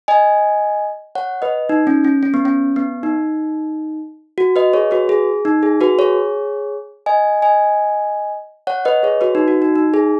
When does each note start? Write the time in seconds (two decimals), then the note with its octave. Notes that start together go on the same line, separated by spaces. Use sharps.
0.08 D#5 G#5
1.15 C#5 F#5
1.42 B4 D#5
1.69 D#4
1.87 C#4
2.05 C#4
2.23 C#4
2.34 B3
2.45 C#4
2.76 B3
3.03 D#4
4.38 F#4
4.56 B4 D#5
4.73 G#4 C#5
4.91 F#4 B4
5.09 G#4
5.45 D#4
5.63 G#4
5.81 F#4 B4
5.99 G#4 C#5
7.06 D#5 G#5
7.42 D#5 G#5
8.67 C#5 F#5
8.85 B4 D#5
9.03 G#4 C#5
9.21 F#4 B4
9.35 D#4
9.48 F#4
9.62 D#4
9.75 D#4
9.94 G#4